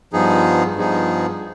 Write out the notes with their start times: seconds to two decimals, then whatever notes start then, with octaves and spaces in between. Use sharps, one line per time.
0.13 G2 F3 B3 D#4 G#4
0.75 G2 F3 B3 D#4 G#4